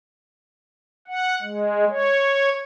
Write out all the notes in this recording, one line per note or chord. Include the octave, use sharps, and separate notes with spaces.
F#5
G#3
C#5